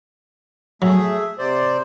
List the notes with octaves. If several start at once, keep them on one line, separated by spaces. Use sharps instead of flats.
F#3 A3 G#4 E5
C3 C5 D5